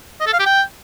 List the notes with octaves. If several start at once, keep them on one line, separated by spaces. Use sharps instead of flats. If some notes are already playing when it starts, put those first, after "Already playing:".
D#5
A4
F5
G4
G5